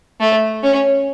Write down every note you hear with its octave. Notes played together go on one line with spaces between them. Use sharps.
A3
C#4